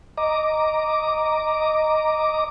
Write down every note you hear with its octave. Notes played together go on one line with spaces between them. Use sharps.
D#5 A#5 D6